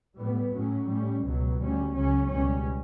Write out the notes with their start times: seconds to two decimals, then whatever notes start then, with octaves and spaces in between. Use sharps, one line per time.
0.17 A2 G3 B3
0.52 A2 F#3 C#4
0.87 A2 G3 C#4
1.23 C#2 B2 F#3
1.58 D2 D3 G3 C#4
1.93 C#2 C#3 F#3 C#4
2.29 C#2 B2 G3 C#4